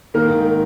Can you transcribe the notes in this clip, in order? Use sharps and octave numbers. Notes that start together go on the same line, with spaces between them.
D#3 A#3 A#4
G#2